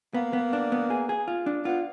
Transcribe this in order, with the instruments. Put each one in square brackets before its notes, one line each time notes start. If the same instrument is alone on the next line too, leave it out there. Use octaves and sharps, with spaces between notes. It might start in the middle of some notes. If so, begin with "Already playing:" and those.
[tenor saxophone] A#3 [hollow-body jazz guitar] B3
[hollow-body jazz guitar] B3
D4
B3
G#4
G#4
F4
D4
[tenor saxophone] B3 [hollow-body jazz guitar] F4